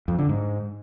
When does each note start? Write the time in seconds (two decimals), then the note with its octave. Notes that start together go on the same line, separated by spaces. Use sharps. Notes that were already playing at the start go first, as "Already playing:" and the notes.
0.08 F2
0.19 D3
0.29 G#2